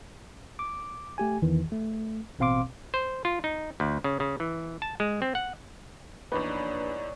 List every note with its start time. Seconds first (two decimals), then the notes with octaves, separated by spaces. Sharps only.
0.59 D6
1.18 A3 G4 G#5
1.42 E2 D#3 E3
1.72 A3
2.39 A1 B2 C4 F5 C6 D6
2.94 C5
3.25 F4
3.44 D#4
3.80 D2
4.04 C#3
4.20 C#3
4.40 E3
4.82 A5
5.00 G#3
5.22 C4
5.35 F#5
6.32 A#1 E2 D#4 B4 C#5 D5